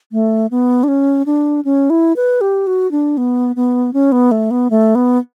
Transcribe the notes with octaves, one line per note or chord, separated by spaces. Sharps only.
A3
B3
D4
C#4
D4
C#4
E4
B4
G4
F#4
D4
B3
B3
C#4
B3
A3
B3
A3
B3